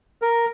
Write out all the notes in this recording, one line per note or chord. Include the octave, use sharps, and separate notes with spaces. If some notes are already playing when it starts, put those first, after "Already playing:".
A#4